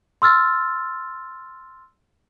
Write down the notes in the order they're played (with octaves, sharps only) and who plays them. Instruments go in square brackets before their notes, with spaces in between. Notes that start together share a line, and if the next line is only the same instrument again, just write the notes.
[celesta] C6 E6 F6 A6